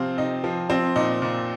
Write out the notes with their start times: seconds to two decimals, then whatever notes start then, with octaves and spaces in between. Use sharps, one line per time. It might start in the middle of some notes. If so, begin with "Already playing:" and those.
Already playing: C3 F3 C4 F4
0.18 C3 D#4
0.44 F3
0.70 F3 C4
0.96 A#2 D#4
1.22 A#2